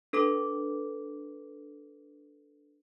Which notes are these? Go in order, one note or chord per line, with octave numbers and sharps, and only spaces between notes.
D4 A4 B4 D6